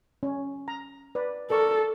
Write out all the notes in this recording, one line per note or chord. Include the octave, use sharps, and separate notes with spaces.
C#4
A#5
B4 D5
A4 A#4 D5 C#6